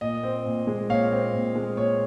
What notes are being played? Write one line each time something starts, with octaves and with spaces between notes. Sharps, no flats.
A#2 D#5
C4
A#2
G#3
A#2 C#5 F5
C4
A#2
G#3
A#2 C#5